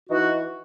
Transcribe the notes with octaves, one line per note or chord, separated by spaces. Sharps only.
E3 D#4 F#4